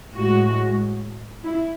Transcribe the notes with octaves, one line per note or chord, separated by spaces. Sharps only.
A2 G#3 F#4
E4